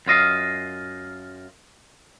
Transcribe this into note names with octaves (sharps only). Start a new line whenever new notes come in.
F#2 F4 D#5 F5